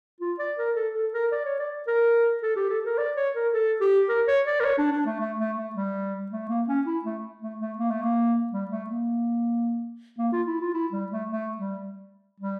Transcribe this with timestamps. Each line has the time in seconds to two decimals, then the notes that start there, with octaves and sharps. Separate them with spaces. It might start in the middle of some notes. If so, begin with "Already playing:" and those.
0.20 F4
0.39 D5
0.58 A#4
0.76 A4
0.94 A4
1.13 A#4
1.32 D5
1.45 C#5
1.59 D5
1.87 A#4
2.42 A4
2.56 G4
2.70 A4
2.85 A#4
2.98 D5
3.16 C#5
3.35 A#4
3.53 A4
3.80 G4
4.09 A#4
4.27 C#5
4.46 D5
4.60 A#4
4.64 C#5
4.78 D4
4.92 D4
5.06 A3
5.20 A3
5.39 A3
5.57 A3
5.75 G3
6.31 A3
6.49 A#3
6.68 C#4
6.86 E4
7.04 A3
7.42 A3
7.60 A3
7.78 A#3
7.90 A3
8.03 A#3
8.52 G3
8.70 A3
8.89 A#3
10.18 A#3
10.32 F4
10.47 E4
10.60 F4
10.74 E4
10.92 G3
11.12 A3
11.29 A3
11.57 G3
12.40 G3